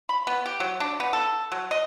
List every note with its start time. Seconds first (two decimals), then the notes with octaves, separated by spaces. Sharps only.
0.09 B5
0.27 B3
0.46 G4
0.60 F#3
0.80 D4
1.00 B3
1.13 A4
1.52 F#3
1.71 D#5